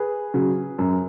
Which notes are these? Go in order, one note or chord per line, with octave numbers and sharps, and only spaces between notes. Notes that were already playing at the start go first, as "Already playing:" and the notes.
Already playing: G#4 B4
C#3 F#3
F#2